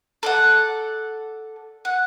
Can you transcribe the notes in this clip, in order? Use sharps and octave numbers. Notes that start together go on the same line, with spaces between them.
A4 D5 F#5
F#5